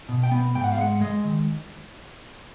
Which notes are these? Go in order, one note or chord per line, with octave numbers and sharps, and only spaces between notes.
B2
G5
B3
G#2 G5
F#5
F5
G#3 F#5
G#3 D#5
D#3